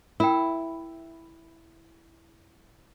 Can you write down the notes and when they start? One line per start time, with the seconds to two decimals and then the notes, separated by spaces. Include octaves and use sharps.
0.20 E4 A#4 G5